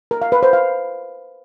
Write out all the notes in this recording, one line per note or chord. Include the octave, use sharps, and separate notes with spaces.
A#4
F5
B4
C5
F5